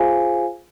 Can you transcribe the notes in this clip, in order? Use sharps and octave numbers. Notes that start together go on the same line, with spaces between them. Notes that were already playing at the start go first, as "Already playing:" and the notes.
Already playing: F4 G#4 C5 F5 G#5